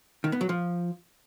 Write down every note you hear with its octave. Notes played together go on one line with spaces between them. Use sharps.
D#3
B3
F#3
F3